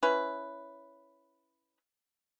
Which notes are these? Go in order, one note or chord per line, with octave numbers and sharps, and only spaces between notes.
C#4 E4 B4